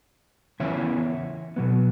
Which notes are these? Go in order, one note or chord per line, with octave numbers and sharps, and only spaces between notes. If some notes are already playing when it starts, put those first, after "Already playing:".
C#3 E3 B3 E4 C#5 E5
B2 F#3 B3